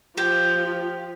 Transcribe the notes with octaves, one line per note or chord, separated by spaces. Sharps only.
F3 G4